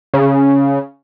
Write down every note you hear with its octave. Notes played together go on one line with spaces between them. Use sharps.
C#3